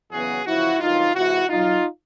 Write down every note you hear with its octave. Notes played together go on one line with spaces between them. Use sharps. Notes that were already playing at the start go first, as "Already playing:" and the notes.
E2 C#3 F#3 B3 F#4 G#4
E2 C#3 F3 E4 F#4
G2 D#3 F#3 D#4 F4
C3 E3 G#3 E4 F#4
E2 B2 F#3 D#4 F4